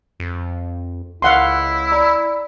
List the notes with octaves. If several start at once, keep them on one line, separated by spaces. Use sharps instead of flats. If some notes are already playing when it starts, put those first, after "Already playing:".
F2
C#2 E4 F5 F#5 C6
D5 A#5 B5